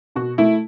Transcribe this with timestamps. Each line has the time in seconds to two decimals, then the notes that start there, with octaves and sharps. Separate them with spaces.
0.16 B2 F#4
0.38 A3 E4